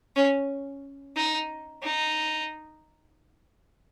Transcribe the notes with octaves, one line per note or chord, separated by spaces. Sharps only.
C#4
D#4
D#4